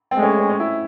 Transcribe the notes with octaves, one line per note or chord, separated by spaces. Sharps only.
C4
G#3 A3
C#4
C4
C#4
C#4
E4